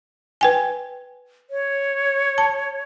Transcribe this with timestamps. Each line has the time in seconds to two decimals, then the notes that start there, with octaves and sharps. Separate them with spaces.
0.41 B4 G5 G#5
1.50 C#5
2.38 A5